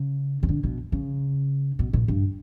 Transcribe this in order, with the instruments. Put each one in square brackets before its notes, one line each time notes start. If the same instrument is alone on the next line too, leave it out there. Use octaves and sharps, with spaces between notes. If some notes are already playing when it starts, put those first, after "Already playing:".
Already playing: [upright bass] C#3
C#3
D3
B2
C#3
B2
A#2
G2